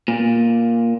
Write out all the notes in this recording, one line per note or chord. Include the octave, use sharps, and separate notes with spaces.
A#2